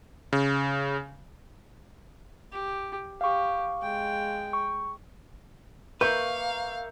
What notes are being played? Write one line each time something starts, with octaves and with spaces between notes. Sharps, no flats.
C#3
G4
G4 F5 C#6
G#3 G5
C#6
A#3 B4 E5 F5 C#6 G6